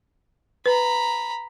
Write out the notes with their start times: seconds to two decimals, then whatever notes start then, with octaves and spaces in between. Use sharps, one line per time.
0.66 B4 A#5 B5